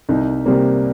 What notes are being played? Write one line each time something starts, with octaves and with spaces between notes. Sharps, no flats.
C2 D#4
C3 G3 A#3